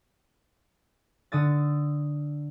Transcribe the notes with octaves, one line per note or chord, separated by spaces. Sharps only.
D3 D#6 A6